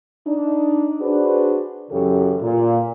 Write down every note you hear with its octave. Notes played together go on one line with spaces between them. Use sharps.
D4 D#4
D4 F#4 G#4 B4 C5 D5
F#2 C#3 E3 G4 A4
A#2